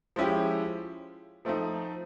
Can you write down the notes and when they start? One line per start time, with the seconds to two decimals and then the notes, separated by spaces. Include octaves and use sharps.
0.16 F3 G#3 C#4 E4 G4
1.45 F3 A3 C4 D#4